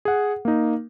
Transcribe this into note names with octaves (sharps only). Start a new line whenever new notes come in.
G#4 F#5
A#3 D#4